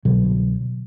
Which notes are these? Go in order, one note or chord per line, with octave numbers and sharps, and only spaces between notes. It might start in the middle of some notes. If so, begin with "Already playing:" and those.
C2 B2 D3 F#3